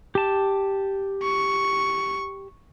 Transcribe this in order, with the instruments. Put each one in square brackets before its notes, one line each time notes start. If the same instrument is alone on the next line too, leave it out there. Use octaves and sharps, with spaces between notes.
[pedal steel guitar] G4 A5
[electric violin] C#6